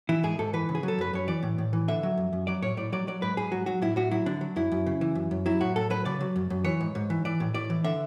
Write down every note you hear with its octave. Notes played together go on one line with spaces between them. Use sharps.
E3 E4
G#2 G#4
G#2 A4
E3 B4
C#3
G#4
F#3
A4
F#2 B4
F#2 C#5
E3 D5
A2
A2
E3
D3 E5
F#3
F#2
F#2
F#3 D5
A2 C#5
A2 D5
F#3 D5
F#3 D5
G#2 B4
G#2 G#4
F#3 F#4
F#3 F#4
A2 E4
A2 F#4
F#3 E4
D3 D4
F#3
F#2 E4
F#2
C#3
E3
F#2
F#2
F#3 E4
A2 F#4
A2 A4
F#3 B4
C#3 D5
F#3
F#2
F#2
E3 C#5
G#2
G#2
E3
E3 D5
A2
A2 D5
E3
D3 E5